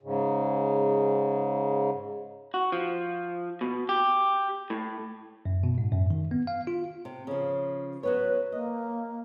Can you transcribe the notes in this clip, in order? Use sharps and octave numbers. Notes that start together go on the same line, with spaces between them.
G#2 C#3
F#4
F3
B2
G4
A2
F#2
B2
G#2
F#2
D#3
B3
F5
F4
C3
C#3 F3
F#3 B3 B4 C#5
A#3 D#5